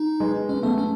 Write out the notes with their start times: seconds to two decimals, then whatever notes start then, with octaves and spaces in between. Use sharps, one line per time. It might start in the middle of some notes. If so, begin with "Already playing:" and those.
Already playing: D#4
0.20 G#3 B3
0.49 G#3 B3 C#4
0.63 A3 B3
0.78 C#4